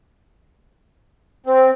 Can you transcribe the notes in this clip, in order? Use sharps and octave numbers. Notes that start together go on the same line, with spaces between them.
C4